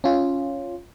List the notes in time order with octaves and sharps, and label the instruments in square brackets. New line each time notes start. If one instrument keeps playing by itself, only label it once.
[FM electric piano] C#4 F4